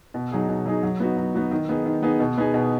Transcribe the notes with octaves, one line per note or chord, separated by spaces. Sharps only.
B2
F#3 D#4 G#4
B2
F#3 D#4 G#4
F#3
B3 D#4 F#4
F#3
B3 D#4 F#4
D#3
B3 D#4 G#4
D#3
B3 D#4 G#4
B2
B3 D#4 G#4
B2